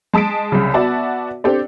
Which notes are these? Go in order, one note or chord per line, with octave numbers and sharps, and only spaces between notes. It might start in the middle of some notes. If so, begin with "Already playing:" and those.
G#3 A5 D#6 B6 D7
C2 C#3
B3 F#4 D5 E5 A5
C4 D4 G4 A4 D5